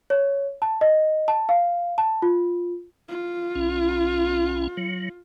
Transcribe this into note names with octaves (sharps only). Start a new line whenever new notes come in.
C#5
A5
D#5
A5
F5
A5
F4
F4
B1 C#4
F#3